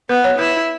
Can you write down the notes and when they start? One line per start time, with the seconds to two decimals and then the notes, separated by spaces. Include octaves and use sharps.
0.09 B3 B4
0.24 C#5
0.39 E4 B4